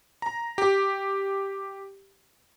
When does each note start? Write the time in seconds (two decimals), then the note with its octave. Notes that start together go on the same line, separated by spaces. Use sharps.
0.22 A#5
0.58 G4